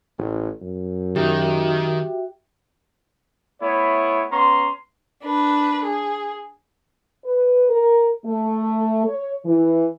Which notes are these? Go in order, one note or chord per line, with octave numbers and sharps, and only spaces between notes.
A1
F#2
D#3 F#4 G4 E5 G5
A3 B3 E4 C#5
B3 C#4 A#5 C6
D4 B4
G#4
B4
A#4
A3
C#5
E3